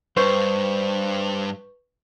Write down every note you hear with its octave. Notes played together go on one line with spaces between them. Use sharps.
G2 B4 C5 C#6 G6